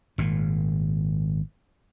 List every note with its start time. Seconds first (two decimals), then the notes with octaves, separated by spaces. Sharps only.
0.18 G#1 A#2